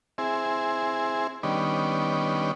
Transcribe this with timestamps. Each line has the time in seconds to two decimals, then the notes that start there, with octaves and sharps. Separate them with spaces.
0.18 C4 E4 G#4
1.43 D#3 G3 B3 C#4 D4